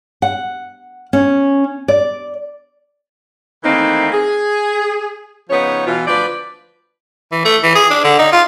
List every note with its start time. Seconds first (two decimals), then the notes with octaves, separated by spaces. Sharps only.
0.22 F#5
1.13 C#4
1.88 D5
3.64 D#3 E3 A3 A#3 C4 D#4
4.12 G#4
5.50 C#3 F3 B3 D#4 C#5
5.86 B2 E3 F4
6.07 D2 F3 B4 D5
7.32 E3
7.45 A3
7.63 E3
7.75 G#4
7.90 D4
8.04 D3
8.19 D#4
8.32 F4